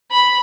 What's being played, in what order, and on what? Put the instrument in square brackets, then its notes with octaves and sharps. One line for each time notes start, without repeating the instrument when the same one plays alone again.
[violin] B5